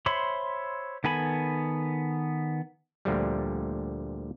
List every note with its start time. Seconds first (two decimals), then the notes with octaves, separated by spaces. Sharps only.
0.06 C5 C#5 E5 B5 C6
1.04 D#3 B3 A4 G#5 B5
3.05 D2 A#2 D3 F3 G3